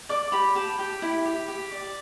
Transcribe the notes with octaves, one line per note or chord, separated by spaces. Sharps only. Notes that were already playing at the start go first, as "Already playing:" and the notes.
D5 D6
G4 B5
G4 A5
G4 G5
E4
G4
G4
D5